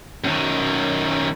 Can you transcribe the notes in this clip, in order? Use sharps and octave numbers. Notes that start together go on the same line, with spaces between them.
F#2 D#3